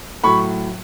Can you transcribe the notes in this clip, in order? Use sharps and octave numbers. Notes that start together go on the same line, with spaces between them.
A2 F#3 B5 C#6